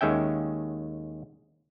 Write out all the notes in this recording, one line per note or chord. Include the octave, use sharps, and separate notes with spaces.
D#2 D#3 G#3 C#4 E5 G5